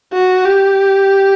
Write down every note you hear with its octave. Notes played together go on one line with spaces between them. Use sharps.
F#4
G4